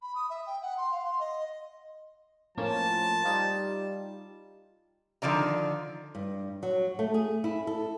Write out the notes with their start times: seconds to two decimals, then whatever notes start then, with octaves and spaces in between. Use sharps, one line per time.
0.02 B5
0.15 D#6
0.30 E5
0.46 G5
0.62 F#5
0.77 C6
0.91 F5
1.04 C6
1.19 D#5
2.58 A2 F3 A#3 C#4 A5
3.25 G3 D#4 F4 G4
5.22 D3 D#3 F3 D5 A#5
6.15 G2
6.63 F#3
6.99 A3
7.14 G#4
7.44 E4
7.67 A4